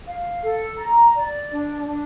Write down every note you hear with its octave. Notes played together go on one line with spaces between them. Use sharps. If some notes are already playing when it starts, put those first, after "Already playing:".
F5
A4
A#5
D5
D4
D4